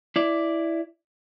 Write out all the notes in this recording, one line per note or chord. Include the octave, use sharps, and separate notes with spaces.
E4 D5